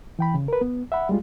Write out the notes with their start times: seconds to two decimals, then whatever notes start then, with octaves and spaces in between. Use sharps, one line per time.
0.19 E3 G5 B5
0.34 C#3
0.48 A#4 B4
0.61 B3
0.92 E5 F#5 B5
1.09 G3 G#3 F4